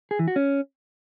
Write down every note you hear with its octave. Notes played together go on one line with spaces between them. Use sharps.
G#4
E3
F#4
C#4